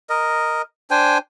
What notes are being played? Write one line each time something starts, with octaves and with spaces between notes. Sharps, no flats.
A#4 D#5
D4 C5 G5 G#5